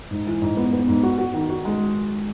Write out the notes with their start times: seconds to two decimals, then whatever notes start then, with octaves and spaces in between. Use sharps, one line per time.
0.11 G#2
0.27 E3
0.42 G#2
0.57 B3
0.73 B3
0.88 G#2
1.03 F#4
1.18 F#4
1.34 D#3
1.50 F#4
1.65 G#3